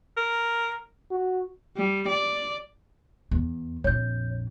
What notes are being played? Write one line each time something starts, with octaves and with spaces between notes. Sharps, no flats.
A#4
F#4
G3
D5
E2
A#1 F2 C#5 G6